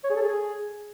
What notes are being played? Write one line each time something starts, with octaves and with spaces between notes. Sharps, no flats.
C#5
G#4
A4
G#4